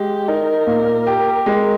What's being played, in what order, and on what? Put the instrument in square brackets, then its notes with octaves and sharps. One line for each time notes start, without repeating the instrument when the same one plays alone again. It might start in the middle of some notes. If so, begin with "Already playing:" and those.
Already playing: [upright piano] G#3 [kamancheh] G4
[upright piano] D#4 [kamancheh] A#4
[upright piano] A#2
G4
[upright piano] G#3 [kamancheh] A#4